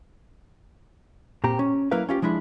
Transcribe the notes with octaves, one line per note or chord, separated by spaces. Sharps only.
A#2 C4 G4 A#5
C#4
F#3 A#3 E4 A#4 B4 F5
C#4 F4 G4
F3 G#3 D4 E4